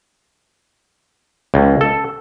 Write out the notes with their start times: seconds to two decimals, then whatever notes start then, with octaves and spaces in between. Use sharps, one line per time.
1.54 C#2
1.81 A4